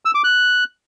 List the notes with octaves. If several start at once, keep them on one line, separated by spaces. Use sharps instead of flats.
E6
D6
F#6